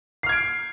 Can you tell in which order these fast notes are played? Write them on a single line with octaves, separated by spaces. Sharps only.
C7 F6 G#6 D7